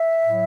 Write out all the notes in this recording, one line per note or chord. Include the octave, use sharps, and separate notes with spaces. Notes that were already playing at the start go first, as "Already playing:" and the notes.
Already playing: E5
A2 F#3